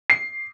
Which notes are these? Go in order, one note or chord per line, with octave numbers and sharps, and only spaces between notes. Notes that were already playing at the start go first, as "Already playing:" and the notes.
C7